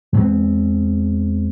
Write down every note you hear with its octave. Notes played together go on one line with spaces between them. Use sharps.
E2 G#3 C4